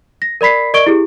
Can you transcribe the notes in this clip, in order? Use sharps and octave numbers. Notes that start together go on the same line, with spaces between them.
A#6
A#4 D5 B5 B6 C7
A#4 D5 D#5 C#6 D7 G7
E4 G4 G#4